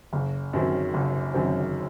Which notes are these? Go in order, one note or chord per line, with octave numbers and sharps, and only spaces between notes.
F#1
F#2 D#3 F#3 C4
F#1
F#2 D#3 F#3 C4